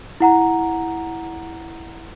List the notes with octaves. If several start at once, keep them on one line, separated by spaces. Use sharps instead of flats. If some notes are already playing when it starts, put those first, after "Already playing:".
E4 F#5 A#5